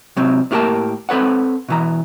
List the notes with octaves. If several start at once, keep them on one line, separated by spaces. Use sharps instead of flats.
C3 F#3 C4
A2 A#3 F4 G4 A#4 A5
C4 A4 B4 C#5 F#5
B2 E3 A#5